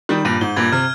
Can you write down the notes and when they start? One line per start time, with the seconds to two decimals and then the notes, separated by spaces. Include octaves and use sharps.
0.09 D#3 G3 G6
0.25 G2 A#2 D#7
0.41 G#2 G7
0.56 G2 A#2 G#6
0.72 C3 F6